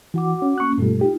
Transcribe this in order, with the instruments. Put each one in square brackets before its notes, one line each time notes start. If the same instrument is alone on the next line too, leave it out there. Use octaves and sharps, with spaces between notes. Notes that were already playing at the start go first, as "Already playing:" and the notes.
[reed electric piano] E3 [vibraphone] F#4 F#5 D6
[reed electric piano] C#4
[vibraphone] A#3 C#4 [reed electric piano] C#6 F#6
[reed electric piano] G2 B2 G3 [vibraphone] A3 F4 A4
[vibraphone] D#4 F4 [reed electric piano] G4